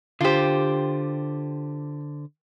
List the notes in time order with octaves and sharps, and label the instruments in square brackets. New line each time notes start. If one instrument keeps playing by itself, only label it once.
[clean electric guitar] D3 C5 [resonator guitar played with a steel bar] F4 G4